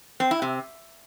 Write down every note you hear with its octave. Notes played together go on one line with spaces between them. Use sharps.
C4
E4
C3